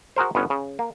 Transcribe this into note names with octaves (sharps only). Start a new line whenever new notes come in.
F#4 G#4 A#4 C5
G1 B3 C#4 F#5
C#3
A#3